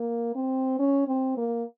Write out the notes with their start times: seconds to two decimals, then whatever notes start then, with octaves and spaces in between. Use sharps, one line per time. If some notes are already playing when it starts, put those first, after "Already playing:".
Already playing: A#3
0.35 C4
0.79 C#4
1.07 C4
1.37 A#3